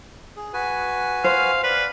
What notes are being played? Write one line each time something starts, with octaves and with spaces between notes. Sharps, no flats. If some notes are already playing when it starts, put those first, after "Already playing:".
G#4
F#4 B4 G#5
C5 F5
B4 D5